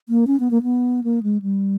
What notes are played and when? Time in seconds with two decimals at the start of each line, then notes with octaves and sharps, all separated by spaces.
0.09 A#3
0.27 C#4
0.40 B3
0.51 A#3
0.63 B3
1.04 A#3
1.23 G#3
1.42 G3